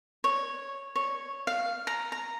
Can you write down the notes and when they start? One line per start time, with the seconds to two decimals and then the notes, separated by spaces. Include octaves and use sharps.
0.24 C#5
0.96 C#5
1.47 F5
1.87 A#5
2.12 A#5